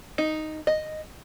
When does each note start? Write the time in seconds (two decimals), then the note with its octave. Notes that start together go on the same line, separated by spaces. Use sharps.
0.18 D#4
0.67 D#5